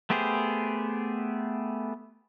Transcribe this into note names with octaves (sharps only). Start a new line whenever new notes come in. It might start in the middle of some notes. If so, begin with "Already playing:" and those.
A3 B3 G4 G#4 C5